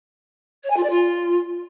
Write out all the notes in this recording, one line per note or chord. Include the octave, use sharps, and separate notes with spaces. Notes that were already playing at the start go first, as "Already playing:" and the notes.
C#5
G#5
F4
D5
F4